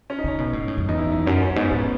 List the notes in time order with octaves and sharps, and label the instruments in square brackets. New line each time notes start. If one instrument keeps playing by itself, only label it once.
[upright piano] C#4
D#4
[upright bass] C#3 [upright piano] C#4
[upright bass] B2
A2
G#2
F#2
[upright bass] E2 [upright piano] D#4
[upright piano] E4
D#4
[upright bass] F#2 [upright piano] C#4
[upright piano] C#4
[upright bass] F#2
[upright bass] G#2 [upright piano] B3
[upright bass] A2 [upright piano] B3